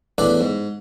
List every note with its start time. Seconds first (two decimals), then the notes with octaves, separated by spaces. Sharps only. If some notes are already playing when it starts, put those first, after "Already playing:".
0.18 E2 A2 D4 B4 D5 G5
0.41 G#2